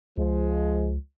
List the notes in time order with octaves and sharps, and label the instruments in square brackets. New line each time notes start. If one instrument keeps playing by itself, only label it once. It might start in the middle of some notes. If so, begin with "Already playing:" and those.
[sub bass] C#2 [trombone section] F3 G#3